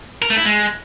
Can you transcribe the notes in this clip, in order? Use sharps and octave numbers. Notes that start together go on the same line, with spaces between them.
A#4
A3
E4
G#3